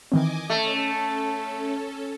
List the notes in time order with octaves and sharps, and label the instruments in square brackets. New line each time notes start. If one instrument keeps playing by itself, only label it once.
[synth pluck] D#3 E3 C4 [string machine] D#5 G#5 D6
[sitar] A3 [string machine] C#4 A4